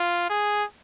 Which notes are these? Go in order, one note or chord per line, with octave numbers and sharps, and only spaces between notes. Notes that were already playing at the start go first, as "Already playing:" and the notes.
Already playing: F4
G#4